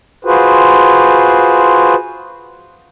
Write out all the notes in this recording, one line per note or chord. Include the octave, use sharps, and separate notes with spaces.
F4 F#4 G#4 B4 C5